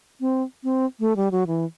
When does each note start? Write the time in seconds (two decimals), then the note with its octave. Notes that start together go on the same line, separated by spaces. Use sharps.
0.21 C4
0.64 C4
1.00 A3
1.16 G3
1.31 F#3
1.47 E3